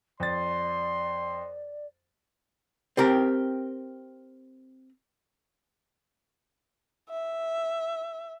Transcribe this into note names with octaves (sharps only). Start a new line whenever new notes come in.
F2 D5 C6 A6
C4 G4 A#4
E5